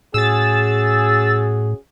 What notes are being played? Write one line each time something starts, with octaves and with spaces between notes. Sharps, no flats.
A2 C#4 F#4 G#4 E6 A6